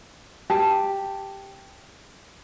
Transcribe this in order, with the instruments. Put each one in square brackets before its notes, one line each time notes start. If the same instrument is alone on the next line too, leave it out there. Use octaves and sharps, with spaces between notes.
[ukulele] G4 A5